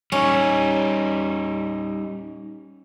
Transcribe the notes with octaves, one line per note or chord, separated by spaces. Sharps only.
G3 C#4 D#4